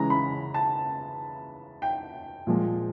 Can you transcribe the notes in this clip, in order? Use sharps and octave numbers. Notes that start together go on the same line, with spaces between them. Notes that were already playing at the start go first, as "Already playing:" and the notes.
Already playing: C#3 E3 G#3 C#4 A#5
B5
A5
G5
A#2 F3 G#3